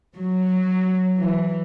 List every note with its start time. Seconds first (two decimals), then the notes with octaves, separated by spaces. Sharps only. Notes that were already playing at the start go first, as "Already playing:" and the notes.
0.16 F#3
1.17 E3